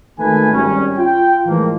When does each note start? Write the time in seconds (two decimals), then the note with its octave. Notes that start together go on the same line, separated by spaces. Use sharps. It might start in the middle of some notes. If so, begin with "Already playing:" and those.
0.19 G#1 D#3 A3 A#3 B4 G#5
0.52 G#1 G3 C#4
0.97 F4 G5
1.46 A2 E3 F3 G#3 A#3